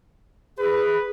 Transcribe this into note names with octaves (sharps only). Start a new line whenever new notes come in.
G#4 B4